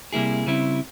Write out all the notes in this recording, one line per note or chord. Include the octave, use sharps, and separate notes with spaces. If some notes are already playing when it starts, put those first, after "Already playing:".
C3 G3 A#3 E4 G#4
C#3 G3 C4 E4